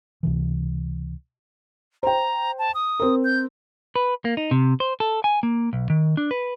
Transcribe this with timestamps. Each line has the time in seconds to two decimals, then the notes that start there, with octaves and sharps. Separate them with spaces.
0.23 C#2 C3 E3
2.03 C5 G5 A#5
2.59 A5
2.74 D#6
3.00 C4 A#4
3.24 G6
3.96 B4
4.25 A#3
4.37 D#4
4.51 C3
4.80 C5
5.00 A4
5.24 G#5
5.43 A#3
5.73 B1
5.90 D#3
6.17 D4
6.31 B4